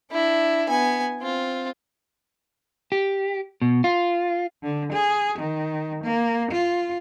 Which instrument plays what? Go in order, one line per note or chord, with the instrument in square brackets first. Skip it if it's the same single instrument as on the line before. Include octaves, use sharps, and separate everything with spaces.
[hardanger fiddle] D4 E4
B3 G#5
C4 F4
[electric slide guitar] G4
B2
F4
[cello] D3
G#4
D#3
A#3
F4